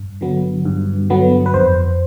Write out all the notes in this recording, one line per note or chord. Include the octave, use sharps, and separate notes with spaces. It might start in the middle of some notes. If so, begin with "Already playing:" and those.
Already playing: G2
D3 F#3 B3
G2
D3 F#3 B3
B4
F2 C5